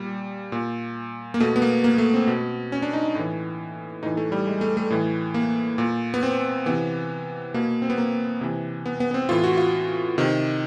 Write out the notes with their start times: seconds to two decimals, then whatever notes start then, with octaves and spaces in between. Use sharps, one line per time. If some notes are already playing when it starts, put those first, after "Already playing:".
Already playing: A#2 G3
0.52 A#2
1.34 A#3
1.40 B2 A3
1.56 B3
1.62 A#3
1.84 A#3
1.98 A3
2.14 C4
2.27 B2
2.72 C#4
2.82 D4
2.93 D#4
3.15 A2 E3
4.03 A2 E3 D#4
4.17 A3
4.32 G3
4.47 G#3
4.61 A3
4.77 A3
4.90 A2 E3
5.34 A#3
5.78 A#2
6.14 B3
6.23 C4
6.66 C3 E3 B3
7.54 B2 A#3
7.82 C4
7.90 B3
7.98 A#3
8.41 C3 E3
8.86 B3
9.00 B3
9.11 B3
9.14 C4
9.29 A2 E3 F4
9.44 F#4
9.57 F4
10.18 C3 D#3